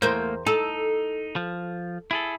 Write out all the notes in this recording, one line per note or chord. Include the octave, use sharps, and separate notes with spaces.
E2 A3 A#3 A#4 C5
D#4 A4
F3
E4 G#4 A4